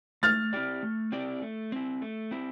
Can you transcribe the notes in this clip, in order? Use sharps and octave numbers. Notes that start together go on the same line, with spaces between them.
A3 F6 A6
C4 E4 G4 D5
A3
C4 E4 G4 D5
A3
C4 E4
A3
C4 E4